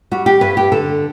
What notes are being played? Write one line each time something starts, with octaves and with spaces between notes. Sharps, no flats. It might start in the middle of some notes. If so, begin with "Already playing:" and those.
G3 F#4
G4
G2 B4
G4
D3 A4